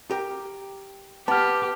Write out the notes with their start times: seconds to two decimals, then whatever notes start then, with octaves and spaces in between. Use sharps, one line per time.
0.11 G4 A#4
1.28 B3 G4 A5 F6